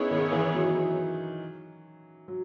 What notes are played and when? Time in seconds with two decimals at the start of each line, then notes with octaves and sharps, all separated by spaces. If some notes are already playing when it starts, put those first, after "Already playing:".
Already playing: B3 C#4 D#4 E4 G#4 C#5
0.11 D#3
0.32 E3
0.54 F#3
2.28 F#3